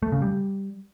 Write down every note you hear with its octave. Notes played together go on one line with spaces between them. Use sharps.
A3
C#3
G3